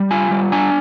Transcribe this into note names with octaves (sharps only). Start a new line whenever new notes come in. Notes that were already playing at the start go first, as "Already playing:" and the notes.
Already playing: G3
F4 G#5
G3
D4 G#5